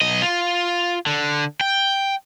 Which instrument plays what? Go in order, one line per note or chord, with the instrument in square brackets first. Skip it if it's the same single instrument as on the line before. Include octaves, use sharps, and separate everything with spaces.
[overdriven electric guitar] B1 D#5
F4
D3
G5